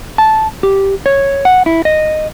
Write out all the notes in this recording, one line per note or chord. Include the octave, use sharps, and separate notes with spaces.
A5
G4
C#5
F#5
E4
D#5